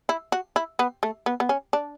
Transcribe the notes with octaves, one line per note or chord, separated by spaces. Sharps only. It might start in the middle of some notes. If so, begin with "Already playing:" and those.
E4
F#4
E4
B3
A3
B3
B3
C#4
D4